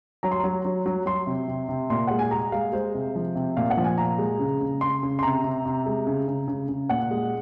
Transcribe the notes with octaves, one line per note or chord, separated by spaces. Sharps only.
F#3 A#5
C6
F#3 A#5
F#3
F#3
F#3 C6
C3
C3
C3
A#2 C6
G#3 F#5
G#5
G#3 A#5
G#3 F5
G#3 C5
C3
F3
C3
A#2 F5
F#5
F3
G#5
A#2 A#5
G#3
C#3
C#3
C#3 C6
C#3
C6
C3 A#5
C3
C3
G#3
C#3
C#3
C#3
C#3
A#2 F#5
G#3